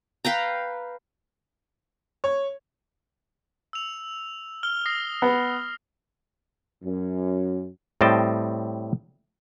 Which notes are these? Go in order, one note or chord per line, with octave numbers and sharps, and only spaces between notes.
B4 F5 G5 A#5
C#5
E6 F7
F6 G7
D#6 A#6 C7
B3
F#2
A2 G3 C4 D#5 G5 A5